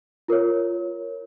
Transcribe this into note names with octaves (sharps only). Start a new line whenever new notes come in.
F4 A#4 C#5